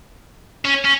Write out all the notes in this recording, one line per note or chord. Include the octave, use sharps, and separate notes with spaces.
C#4
C#4